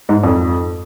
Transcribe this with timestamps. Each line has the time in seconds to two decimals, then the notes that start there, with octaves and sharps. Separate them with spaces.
0.09 G#2
0.23 F2